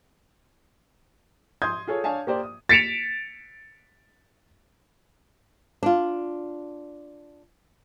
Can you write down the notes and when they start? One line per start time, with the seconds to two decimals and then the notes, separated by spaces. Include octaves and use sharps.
1.62 C6 D#6 G6 G#6
1.87 F4 G#4 A4 C#5
2.04 D4 C#5 F5 G#5 A5
2.27 A#3 G4 C5 D5
2.43 D#6
2.69 A6 B6 C#7 D7 E7 F7
5.83 D4 F4